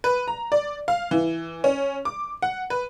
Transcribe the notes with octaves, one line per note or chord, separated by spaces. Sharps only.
B4
A#5
D5
F5
E3
C#4
D6
F#5
B4